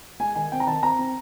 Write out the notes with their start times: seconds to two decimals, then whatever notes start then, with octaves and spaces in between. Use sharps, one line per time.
0.20 G#3 G#5
0.35 D#3 G#5
0.52 C4 G5
0.60 A#5
0.67 D#3 A5
0.83 C4 A#5
0.99 C4